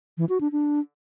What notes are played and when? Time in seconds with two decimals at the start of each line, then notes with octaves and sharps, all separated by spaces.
0.18 E3
0.29 F#4
0.41 D4
0.52 D4